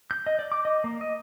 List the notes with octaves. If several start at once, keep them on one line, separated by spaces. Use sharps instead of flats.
G6
D#5
D5
D6
D#5
A#3
D#5